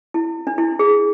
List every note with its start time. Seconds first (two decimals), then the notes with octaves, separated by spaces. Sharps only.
0.14 E4
0.47 D4
0.58 E4
0.79 G#4